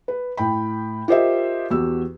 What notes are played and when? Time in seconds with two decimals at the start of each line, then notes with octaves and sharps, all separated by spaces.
0.08 B4
0.37 A2 G5 B5
1.08 F4 G4 A#4 C5 D#5 E5
1.71 E2 F#4 G4 E6